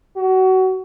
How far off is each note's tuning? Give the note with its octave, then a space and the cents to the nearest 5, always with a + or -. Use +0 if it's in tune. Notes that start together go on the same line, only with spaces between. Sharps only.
F#4 +25